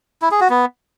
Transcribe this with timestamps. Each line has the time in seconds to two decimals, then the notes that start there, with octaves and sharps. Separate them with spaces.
0.22 E4
0.31 G#4
0.41 F#4
0.50 B3